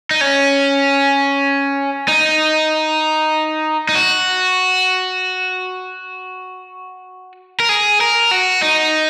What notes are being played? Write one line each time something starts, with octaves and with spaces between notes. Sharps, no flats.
D#4
C#4
D#4
D#4
F#4
A#4
G#4
A#4
F#4
D#4